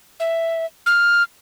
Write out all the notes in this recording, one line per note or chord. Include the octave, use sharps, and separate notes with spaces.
E5
F6